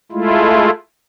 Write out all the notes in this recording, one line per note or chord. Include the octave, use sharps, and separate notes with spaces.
G#3 A3 E4 F4